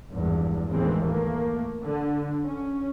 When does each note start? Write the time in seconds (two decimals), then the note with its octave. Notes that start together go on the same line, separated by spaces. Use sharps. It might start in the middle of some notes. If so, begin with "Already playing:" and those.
0.11 G#1 E2 G2
0.71 G1 D#2 A2 E3 G#3 C4
1.05 A3 A#3
1.82 D3
2.44 C#4